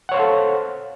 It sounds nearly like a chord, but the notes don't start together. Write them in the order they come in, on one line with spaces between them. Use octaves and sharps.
F#5 C#5 C5 F5 A4